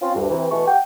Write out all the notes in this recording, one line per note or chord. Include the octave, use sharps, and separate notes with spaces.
C4 C#4 F4
D2 G2
C3 E3
B2 E3 A3 C#6
F#5 G5